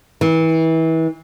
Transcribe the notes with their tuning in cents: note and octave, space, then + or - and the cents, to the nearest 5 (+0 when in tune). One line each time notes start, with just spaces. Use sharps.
E3 -30